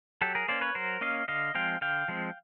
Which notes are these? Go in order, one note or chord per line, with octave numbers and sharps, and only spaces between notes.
F#3 G4 A4
G#4 A#4
A#3 C#4 C5 D5
B4 C#5
F#3 A#4 C5
A#3 C#4 D#5 F5
D3 D#5 F5
F3 G#3 C4 F5 G5
D3 F5 G5
F3 G#3 C4